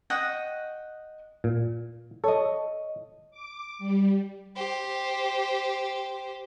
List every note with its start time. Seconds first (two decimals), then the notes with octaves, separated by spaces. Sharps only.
0.10 D#5 F#5 G5 C#6
1.44 A#2
2.24 A4 C#5 D#5
3.31 D6
3.79 G3
4.56 G4 C5